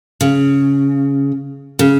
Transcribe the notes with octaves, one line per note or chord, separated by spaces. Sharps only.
C#3
C#3